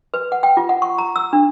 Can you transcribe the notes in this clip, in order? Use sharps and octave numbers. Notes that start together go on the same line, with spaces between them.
B4
F#5
G5
F4
F#5
C#6
A#5
E6
D4